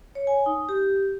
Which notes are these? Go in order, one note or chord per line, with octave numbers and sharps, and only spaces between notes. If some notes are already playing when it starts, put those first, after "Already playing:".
C#5
G#5
D#4
G4